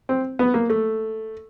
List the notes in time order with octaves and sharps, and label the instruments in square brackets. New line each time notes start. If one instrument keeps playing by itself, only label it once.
[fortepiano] C4
B3
A#3
A3